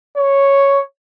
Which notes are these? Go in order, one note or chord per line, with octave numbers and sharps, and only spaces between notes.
C#5